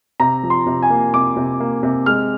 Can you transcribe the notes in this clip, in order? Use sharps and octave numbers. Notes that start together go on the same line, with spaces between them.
C3 A#5
F3
C6
C3
G#5
A#3
C3 D6
C3
A#3
C3
G#3 F6